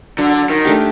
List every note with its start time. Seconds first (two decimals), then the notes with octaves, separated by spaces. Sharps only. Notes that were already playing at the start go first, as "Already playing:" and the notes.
0.18 D3 F#3
0.50 D#3
0.65 A3 D4 G4